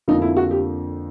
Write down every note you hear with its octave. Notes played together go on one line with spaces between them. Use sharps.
F2 D3 F3 A#3 D#4
E4
F#4
G4